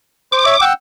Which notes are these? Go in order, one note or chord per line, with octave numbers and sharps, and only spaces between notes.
C5 D6
C#5 E5
F#5 G5 E6